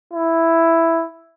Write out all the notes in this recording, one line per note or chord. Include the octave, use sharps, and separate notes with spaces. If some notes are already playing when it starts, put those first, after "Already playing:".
E4